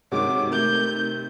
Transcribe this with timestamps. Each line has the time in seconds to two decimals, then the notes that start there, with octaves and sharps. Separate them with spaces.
0.12 C3 D#3 G#3 F#4 C#5 D6
0.52 A3 A#4 G6